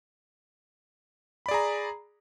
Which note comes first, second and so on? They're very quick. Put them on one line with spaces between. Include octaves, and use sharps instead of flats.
B5 D5 G#4 A#5